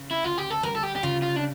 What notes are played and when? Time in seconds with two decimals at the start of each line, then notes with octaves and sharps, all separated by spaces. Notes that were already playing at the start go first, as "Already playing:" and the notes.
Already playing: C#3
0.11 E4
0.23 D2 F4
0.38 G4
0.50 A4
0.63 G3 A#4
0.75 A4
0.83 G4
0.96 G4
1.03 C#3 F4
1.22 F4
1.36 D4